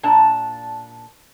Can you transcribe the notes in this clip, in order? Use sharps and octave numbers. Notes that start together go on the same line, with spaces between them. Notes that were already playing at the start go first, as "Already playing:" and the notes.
A#2 D4 A5